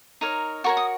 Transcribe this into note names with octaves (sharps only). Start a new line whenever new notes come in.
D#4 A#4 C#5
F#4 A#4 C#5 C#6
D#6